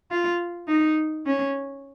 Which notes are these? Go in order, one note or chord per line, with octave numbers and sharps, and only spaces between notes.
F4
D#4
C#4